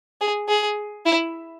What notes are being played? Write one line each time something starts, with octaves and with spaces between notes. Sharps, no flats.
G#4
G#4
E4